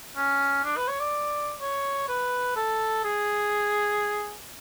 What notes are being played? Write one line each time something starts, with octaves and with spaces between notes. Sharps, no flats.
C#4
D4
B4
C#5
D5
C#5
B4
A4
G#4